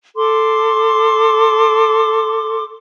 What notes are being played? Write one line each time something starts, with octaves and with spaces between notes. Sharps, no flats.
A4 C6 D6